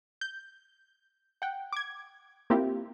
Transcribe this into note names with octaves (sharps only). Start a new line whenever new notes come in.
G6
F#5 G5
D6 G#6
A#3 C4 E4 F4 G4